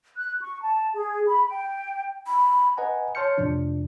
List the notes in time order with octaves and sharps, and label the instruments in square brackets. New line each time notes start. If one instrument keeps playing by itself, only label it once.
[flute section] F#6
C#6
A5
G#4
B5
G5
[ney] B5
[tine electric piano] B4 D#5 F#5 G#5 A#5
C#5 A5 C6 F6 G6 C#7
F2 A2 C3 F3 D4